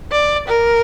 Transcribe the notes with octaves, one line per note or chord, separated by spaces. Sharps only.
D5
A#4